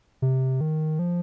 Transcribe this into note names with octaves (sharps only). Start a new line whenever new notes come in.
C3
D#3
F3